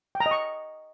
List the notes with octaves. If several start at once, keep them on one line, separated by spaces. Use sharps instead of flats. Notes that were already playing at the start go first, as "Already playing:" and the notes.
G5
A#5
D#5
C#6